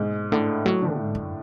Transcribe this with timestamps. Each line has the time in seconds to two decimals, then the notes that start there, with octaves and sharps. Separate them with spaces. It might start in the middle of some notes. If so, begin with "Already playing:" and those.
Already playing: G#2 B2 G#3
0.31 A2 D3 A3
0.65 A2 F#3 A3
0.82 D3 D4
0.98 G#2
1.15 F#2